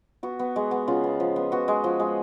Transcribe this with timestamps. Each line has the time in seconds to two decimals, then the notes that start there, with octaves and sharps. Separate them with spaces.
0.23 B3 F#4
0.39 B3
0.56 G#3
0.71 B3
0.87 C#3 F4
1.04 B3
1.20 F3
1.36 B3
1.52 B3 F#4
1.68 G#3
1.84 F3
2.00 G#3